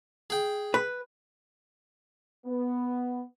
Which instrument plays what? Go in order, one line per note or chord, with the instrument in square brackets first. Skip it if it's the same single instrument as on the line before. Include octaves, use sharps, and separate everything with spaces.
[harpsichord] G#4 G5
[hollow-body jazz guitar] B4
[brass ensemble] B3